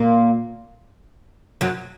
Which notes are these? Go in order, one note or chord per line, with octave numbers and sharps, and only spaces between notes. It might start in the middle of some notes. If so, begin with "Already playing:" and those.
Already playing: A#2 A#3
F#2 F#3